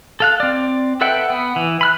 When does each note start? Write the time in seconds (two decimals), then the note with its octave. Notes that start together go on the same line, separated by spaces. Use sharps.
0.20 A4 F5 F#6
0.40 C4 D5
1.01 A4 B4 E5 F#5 G5
1.30 B3
1.56 E3
1.81 B5 F6 F#6